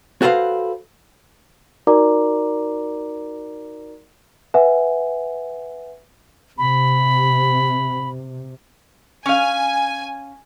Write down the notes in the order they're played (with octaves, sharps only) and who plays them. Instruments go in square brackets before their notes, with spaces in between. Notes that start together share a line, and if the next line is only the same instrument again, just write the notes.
[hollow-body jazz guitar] F#4 A4 B4 C5 F5
[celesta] D#4 F#4 A#4 D5 A#5 D6
B4 E5 F#5 G#5
[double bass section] C3 [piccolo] B5
[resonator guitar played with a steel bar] C#4 F5 [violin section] G#5